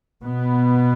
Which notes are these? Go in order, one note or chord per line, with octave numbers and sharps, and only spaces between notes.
B2 B3